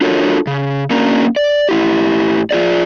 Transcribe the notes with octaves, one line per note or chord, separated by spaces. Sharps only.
D4 F4 F#4 A4 A#4 C#5
C#3
A#3 C#4 D4 F#4 A#4 A#5
D5
A2 E4 G4
F4 G#4 D5